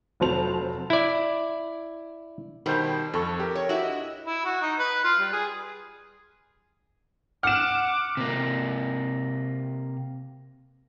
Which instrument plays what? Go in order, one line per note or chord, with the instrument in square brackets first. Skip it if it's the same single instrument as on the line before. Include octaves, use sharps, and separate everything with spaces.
[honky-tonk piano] F1 F#3 C5 A5 F7
[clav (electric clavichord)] E4 D5
[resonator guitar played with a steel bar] B2 G3 [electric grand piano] D#3 C5 G6
[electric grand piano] F2 C#6 [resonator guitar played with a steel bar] A4
[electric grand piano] G4 A#4
[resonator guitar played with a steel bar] C#5
E4 F#4
[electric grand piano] D#5
[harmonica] E4
F#4
D#4
B4
F4
G3
G#4
[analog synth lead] F#5 [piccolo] D6 [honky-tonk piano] F6 E7
[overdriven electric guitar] C3 A#3